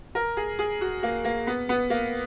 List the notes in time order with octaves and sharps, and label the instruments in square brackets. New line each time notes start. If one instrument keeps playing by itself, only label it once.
[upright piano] A#4
G#4
G#4
F#4
A#3
A#3
B3
B3
A#3